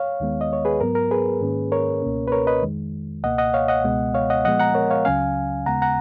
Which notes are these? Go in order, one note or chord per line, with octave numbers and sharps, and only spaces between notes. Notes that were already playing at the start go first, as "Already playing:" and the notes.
Already playing: C#5 F5
D#2 D#3 G#3 B3
D#5
C#5
G#4 B4
G#2 F#3 B3 A#4
A#4
G#4 B4
G#2 D#3 A#3 C#4
A#4 C#5
C#2 B2 A#3 C#4
B4
A#4 C#5
B4 D#5
F2 D#3 G#3
C#2 B2 A#3 D#5 F#5
D#5 F#5
C#5 F5
D#5 F#5
C#2 B2 G#3 B3
C#5 F5
D#5 F#5
A#2 F3 G#3 B3 D#5 F#5
F#5 A#5
A#4 C#5
C#5 F5
C#2 C#3 F#3 C#4 F5 G#5
D#2 C#3 G#3 B3 F#5 A#5
F#5 A#5